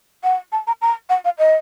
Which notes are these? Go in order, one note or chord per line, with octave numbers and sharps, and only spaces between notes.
F#5
A5
A#5
A#5
F#5
F5
D#5